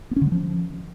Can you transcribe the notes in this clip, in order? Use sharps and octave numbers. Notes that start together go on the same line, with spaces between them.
B3
C#4
D3
G#3
F3